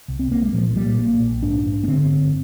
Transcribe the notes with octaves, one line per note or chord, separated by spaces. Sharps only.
C2
C4
C2 A#3
G#3
A#2 F3
A#2 G3
A#1 A#3
A#1
G#2 D4
G#2
A#3
D3 C4
G1